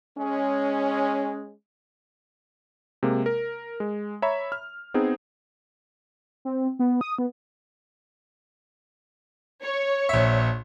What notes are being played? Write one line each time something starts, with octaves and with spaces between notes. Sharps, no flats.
G#3 C#4
C3 G#3 A#3
A#4
G#3
C#5 E5 A#5 B5
F6
B3 C4 D#4 G#4
C4
B3
D#6
B3
C#5
A#1 E5